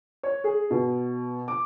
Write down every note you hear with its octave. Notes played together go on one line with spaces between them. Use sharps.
C#5
G#4
B2
D6